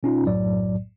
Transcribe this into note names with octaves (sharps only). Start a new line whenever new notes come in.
B2 C#4 D#4 F4
B1 F#2 A2 F#3 D5